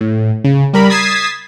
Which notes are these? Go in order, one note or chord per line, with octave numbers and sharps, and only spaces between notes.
A2
C#3
G3 A#4 B5
D#6 G#6 A6 B6 C7 E7